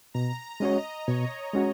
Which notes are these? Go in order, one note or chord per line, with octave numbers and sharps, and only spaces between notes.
B2 A#5
G#3 C#4 F#4 C#5 D#5
B2 C#5
G#3 C#4 F#4